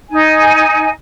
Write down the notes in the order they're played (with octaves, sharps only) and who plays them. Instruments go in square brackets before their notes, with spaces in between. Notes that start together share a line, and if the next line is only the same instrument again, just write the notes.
[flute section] D#4 G#5